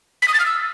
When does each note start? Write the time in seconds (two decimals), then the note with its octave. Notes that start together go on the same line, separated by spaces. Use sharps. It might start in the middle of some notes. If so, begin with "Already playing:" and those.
0.22 B6
0.28 D#6
0.34 A6
0.40 F6
0.46 E6